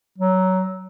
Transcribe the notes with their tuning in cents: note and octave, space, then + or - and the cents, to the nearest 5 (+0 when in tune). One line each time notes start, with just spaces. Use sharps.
F#3 +15